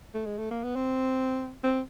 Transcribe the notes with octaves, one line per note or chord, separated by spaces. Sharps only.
A3
G#3
A3
A#3
B3
C4
C4